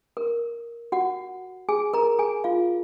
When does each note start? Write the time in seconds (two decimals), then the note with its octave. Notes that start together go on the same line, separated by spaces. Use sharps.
0.17 A#4
0.92 F#4 F#5
1.69 G#4 G#5
1.94 A#4 A#5
2.18 G#4 G#5
2.44 F4 F5